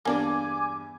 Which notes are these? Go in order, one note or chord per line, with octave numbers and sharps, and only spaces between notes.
E2 G2 A#3 D4 D5 G#5 D6